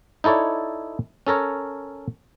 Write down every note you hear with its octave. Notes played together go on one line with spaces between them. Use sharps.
D#4 E4 A4 C#5 D5
C#4 A4 A#4 C#5